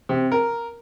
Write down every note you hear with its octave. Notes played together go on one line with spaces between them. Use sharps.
C3
A#4